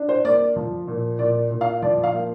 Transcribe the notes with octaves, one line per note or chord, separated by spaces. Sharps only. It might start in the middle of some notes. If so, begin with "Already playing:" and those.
Already playing: D4
C5
A#3 D5
F3
A#2
A#2 D5
A#2
F5
F3 D5
F5
A#3